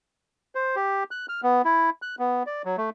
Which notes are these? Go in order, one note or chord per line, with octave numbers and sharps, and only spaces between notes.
C5
G4
F#6
F6
B3
E4
F#6
B3
D5
F#3
A3